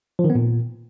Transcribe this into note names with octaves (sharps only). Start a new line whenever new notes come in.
F3
D#3
B3
A#2